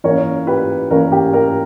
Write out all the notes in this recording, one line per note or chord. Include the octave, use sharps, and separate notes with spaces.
E3 A#3 C#4 A#4 C#5
G4 B4
E3 A#3 C#4 A#4
G4
A#4